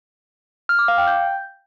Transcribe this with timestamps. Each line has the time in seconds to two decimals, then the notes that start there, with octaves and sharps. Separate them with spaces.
0.69 F6
0.79 D6
0.88 F5
0.98 G5
1.07 G6